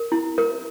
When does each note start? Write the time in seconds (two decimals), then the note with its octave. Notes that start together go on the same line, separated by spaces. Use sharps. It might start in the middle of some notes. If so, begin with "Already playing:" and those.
Already playing: A#4
0.12 E4
0.38 A#4